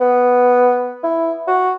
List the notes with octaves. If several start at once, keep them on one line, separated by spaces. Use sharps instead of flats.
B3
E4
F#4